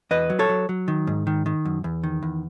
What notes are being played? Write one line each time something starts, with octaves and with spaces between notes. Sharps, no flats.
E2 B4 D#5
F#3
A4 C#5
F#3
F#3
D#3
G#2
D#3
D#3
F#2
E2
D#3
E2